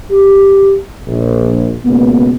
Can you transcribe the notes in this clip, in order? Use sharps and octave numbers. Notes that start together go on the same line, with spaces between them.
G4
A#1
C#2 B2 A#3 B3